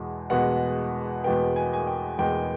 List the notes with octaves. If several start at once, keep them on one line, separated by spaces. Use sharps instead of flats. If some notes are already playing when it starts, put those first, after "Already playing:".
Already playing: E2 B2 G#3
E2 B2 G#3 B3 F#5
E2 B2 G#3 B3 G5
G#5
G#5
G5
E2 B2 G#3 B3 G5